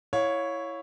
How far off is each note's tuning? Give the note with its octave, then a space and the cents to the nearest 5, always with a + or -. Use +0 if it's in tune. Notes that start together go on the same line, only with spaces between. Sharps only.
E4 +0 C#5 +0 F5 +30